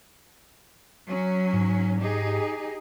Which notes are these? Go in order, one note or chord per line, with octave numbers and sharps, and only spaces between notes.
F#3 C#4
G#2
D#4 G4 G#4